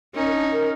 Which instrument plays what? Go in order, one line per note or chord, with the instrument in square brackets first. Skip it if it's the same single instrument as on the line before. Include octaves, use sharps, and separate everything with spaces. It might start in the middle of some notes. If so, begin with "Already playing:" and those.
[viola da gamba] C#4 D#4 [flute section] A#4
[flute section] D4
A#4